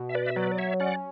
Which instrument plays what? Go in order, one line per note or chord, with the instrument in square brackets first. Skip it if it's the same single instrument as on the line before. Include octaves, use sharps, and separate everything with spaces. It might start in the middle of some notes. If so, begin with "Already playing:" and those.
Already playing: [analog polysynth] B2
[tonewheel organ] E5
B4 D5
E5
[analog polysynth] F#3 [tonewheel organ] B4 D5
[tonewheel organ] D5
C#5 E5
[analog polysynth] C#4 [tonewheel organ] D5 F#5